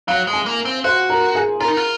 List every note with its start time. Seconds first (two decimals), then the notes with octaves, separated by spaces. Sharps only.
0.08 F#3 F5
0.27 G#3
0.33 G#5
0.46 A#3
0.65 C4
0.84 F#4 C5
1.10 A#4
1.35 G#4
1.60 F4 A#4
1.68 D#4
1.77 F4